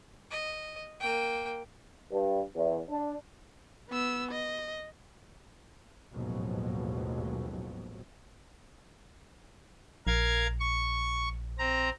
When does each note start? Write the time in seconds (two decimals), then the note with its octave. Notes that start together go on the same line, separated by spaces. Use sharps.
0.31 D#5
1.00 A#3 G5
2.11 G2
2.55 E2
2.89 D4
3.90 B3 E6
4.32 D#5
6.14 A1 D#2 G#2 B2 F3 F#3
10.07 A#1 A#4 F5 G#6
10.60 C#6
11.59 C4 A#5